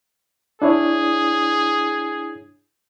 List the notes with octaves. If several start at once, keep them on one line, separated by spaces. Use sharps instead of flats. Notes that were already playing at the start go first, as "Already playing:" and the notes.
D4 E4 G#4 C#5